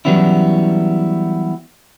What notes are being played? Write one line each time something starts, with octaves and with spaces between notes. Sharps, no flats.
E3 F#3 G3 B3 C#4 E4